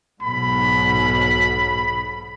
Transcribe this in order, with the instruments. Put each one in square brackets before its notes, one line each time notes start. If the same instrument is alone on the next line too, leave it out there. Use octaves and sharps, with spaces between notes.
[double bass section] B1 G#2 B2 [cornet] B5